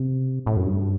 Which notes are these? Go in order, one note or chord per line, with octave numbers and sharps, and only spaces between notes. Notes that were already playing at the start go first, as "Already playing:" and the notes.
Already playing: C3
A2
F#2
G2